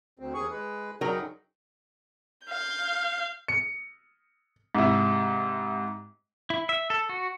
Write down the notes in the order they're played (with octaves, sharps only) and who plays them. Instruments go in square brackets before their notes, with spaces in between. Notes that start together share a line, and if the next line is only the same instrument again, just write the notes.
[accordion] D2 C4
D#2 G#4 C#6
G#3 B4
[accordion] F#2 C#3 D#4 [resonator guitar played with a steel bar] F#3 A#4 G5
[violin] F5 G6
[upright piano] C#7
G#2 C3 E4
[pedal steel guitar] E4
E5
A4
F#4